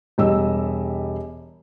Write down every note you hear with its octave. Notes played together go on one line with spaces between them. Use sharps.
E1 G3 D#5 E6